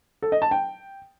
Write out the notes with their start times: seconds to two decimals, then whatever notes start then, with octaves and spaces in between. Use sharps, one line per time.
0.22 A4
0.32 D#5
0.42 A5
0.51 G5